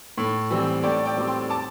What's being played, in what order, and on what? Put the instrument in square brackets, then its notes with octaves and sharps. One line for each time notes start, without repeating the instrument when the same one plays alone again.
[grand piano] A2
E3 G3 C4
A2 D5 G5
D5 G5
G3 C4 D6
G5 C6
A5 D6